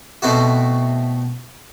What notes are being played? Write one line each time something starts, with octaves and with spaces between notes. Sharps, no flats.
B2 A3 C4 E4 F#4